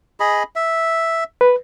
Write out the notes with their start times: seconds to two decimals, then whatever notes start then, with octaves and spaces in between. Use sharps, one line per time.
0.20 G#4 D#5 B5
0.56 E5
1.41 B4